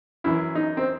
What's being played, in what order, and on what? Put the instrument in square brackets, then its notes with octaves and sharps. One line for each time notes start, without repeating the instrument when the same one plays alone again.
[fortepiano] F#2 E3 E4
D#4
C4